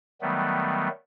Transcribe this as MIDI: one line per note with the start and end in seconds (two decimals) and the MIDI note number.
0.21 0.88 51
0.21 0.88 54
0.21 0.88 55
0.21 0.88 57
0.21 0.88 59